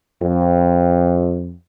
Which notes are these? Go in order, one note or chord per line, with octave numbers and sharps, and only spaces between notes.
F2